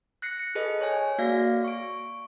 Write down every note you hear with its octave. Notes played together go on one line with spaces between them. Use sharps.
F#6 A#6 C7 C#7
C#7
G#4 A4 B4 D#5
C#5 G#5
A#3 F#4 D5 F5 A#6
C#6 D7